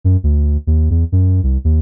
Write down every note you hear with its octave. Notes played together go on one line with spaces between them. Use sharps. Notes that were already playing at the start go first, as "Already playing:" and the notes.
F#2
D2
D#2
E2
F#2
C2
D#2